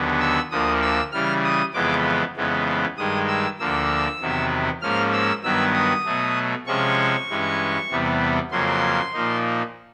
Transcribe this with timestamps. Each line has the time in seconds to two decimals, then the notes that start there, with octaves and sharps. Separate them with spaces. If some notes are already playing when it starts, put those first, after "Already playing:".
Already playing: D#2 D3 F#3 B3
0.20 E6
0.51 D2 D3 F3 A#3 D#6
0.82 E6
1.12 C#3 E3 G3 F6
1.44 D#6
1.74 F2 C#3 E3 G#3 B3 D6
2.36 F2 C#3 E3 G#3 B3
2.97 G2 D#3 G#3 D#6
3.28 E6
3.59 D2 D3 F3 A#3 E6
4.20 E2 C3 D#3 F#3 B3
4.82 G#2 F3 A#3 C#4 F6
5.12 E6
5.43 G2 D#3 F#3 B3 E6
5.74 D#6
6.05 B2 F#3 A3
6.66 C3 F3 G#3 C#4 C#6
7.29 G2 E3 G#3 C#4
7.90 E2 C3 E3 G3 B3
8.51 F2 C#3 F#3 A#3 C6
9.14 A#2 F3 A#3 D#4